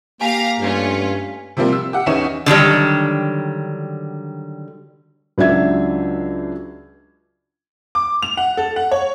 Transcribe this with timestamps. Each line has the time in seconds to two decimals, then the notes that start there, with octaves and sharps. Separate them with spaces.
0.21 A#3 G4 F5 G#5 A#5 B6
0.60 G2 A3 C#4 F4
1.57 C3 F3 G3 A#3 C4
1.73 E6
1.93 G4 F#5
2.06 E2 B3 C#4 D#4 C#5 E7
2.46 D3 D#3 F#3 G3
5.38 C#2 F#3 D4 E5 G#6
7.95 D6
8.23 F7
8.37 F#5
8.57 A4
8.76 F#5
8.92 C#5